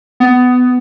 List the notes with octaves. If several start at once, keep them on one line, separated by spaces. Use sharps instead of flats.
B3